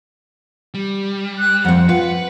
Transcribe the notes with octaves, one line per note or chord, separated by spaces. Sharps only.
G3
F#6
F2 C4 F#5
F4 B4